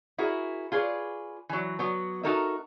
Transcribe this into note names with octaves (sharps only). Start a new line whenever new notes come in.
E4 F#4 G#4 A#4
F4 G#4 B4 C#5 D5
E3 F#3
F#3 B3
D#4 F#4 A4 A#4 D#5 E5